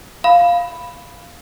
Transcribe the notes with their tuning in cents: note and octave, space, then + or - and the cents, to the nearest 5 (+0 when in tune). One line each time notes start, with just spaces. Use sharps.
F5 +0 B5 +0